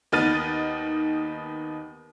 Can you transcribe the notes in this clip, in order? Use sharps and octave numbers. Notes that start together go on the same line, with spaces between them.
D#2 B3 D#4 F6 A6 D#7